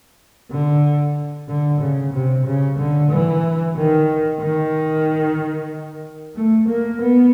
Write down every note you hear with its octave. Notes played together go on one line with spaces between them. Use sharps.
D3
D3
C#3
C3
C#3
D3
E3
D#3
D#3
A3
A#3
B3